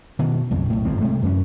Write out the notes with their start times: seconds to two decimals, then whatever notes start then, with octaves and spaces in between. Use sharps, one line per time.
0.19 B2 D#3 E3
0.51 B1 F2 C#3
0.70 B1 A2
0.85 G1 F2 F3 C4
1.01 C3 G#3 A3
1.23 F#2 E3 B3 C#4